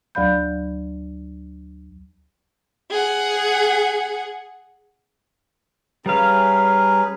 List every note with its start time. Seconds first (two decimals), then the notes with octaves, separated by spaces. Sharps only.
0.15 D2 F#3 D5 F5 B5 G6
2.91 G#4 F#5
6.06 G3 C#4 G#4 B4 F5 A#5